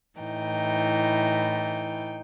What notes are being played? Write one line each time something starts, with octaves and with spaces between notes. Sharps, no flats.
A2 E3 D#4 G5